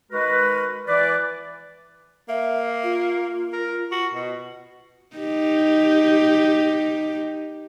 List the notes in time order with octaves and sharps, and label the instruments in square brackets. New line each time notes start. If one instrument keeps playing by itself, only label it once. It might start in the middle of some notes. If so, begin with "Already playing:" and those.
[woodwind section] D#3 G#3 F#4 A#4 B4
E3 B4 D5
[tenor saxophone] A#3 [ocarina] E5
[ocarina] F4
[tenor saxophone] A#4
F#4
B2
[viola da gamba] D#4 G4